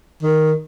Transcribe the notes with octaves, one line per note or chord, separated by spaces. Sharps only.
D#3